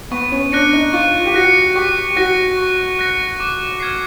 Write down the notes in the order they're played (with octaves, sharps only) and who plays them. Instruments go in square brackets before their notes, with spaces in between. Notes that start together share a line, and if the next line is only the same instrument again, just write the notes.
[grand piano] B3 [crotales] C#6
[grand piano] C#4
[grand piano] D4 [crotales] F#6 A#6 C#7
[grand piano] D#4
[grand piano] F4 [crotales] C#6
[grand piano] G4
[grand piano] F#4 [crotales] F#6 A#6 C#7
[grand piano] G4 [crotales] C#6
[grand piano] F#4 [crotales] F#6 A#6 C#7
[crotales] C#6
F#6 A#6 C#7
D6
F6 G#6 C7